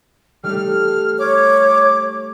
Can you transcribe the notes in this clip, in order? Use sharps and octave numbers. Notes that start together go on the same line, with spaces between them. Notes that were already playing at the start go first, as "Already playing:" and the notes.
G3 A3 D#4 F6
C#5 D6